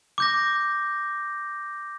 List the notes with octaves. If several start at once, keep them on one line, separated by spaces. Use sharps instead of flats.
D6 G6 A#6